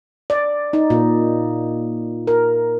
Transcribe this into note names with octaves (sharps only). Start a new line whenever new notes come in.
D5
D#4
A#2
A#4